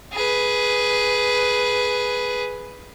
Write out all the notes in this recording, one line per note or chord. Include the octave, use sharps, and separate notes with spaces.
G#4 B4